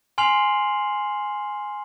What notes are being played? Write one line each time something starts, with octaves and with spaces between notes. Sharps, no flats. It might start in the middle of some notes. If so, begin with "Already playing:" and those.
G#5 C6 F6 C7 F7 F#7